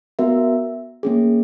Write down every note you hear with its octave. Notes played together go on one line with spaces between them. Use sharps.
B3 F#4 A#4 E5
A#3 C#4 G#4